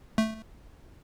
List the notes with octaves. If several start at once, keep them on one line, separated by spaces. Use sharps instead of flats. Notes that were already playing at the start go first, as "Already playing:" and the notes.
A3